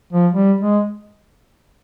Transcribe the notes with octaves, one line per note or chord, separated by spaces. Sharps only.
F3
G3
G#3